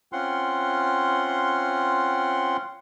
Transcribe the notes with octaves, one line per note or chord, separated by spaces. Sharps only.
C4 C#4 F4 F#5 C6